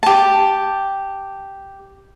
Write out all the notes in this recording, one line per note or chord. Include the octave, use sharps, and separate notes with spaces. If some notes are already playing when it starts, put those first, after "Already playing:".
G4 A5